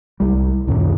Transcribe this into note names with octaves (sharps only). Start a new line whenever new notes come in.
C2 G3
C#2 F#2 A#2 D#3